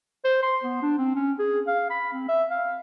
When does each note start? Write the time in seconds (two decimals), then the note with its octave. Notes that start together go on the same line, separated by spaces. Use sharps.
0.24 C5
0.43 C6
0.63 B3
0.82 D4
0.98 C4
1.16 C#4
1.39 G#4
1.67 F5
1.90 B5
2.13 C4
2.28 E5
2.51 F5